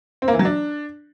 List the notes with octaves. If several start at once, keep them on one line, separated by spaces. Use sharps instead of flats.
C4
A#3
E3
F#3
D4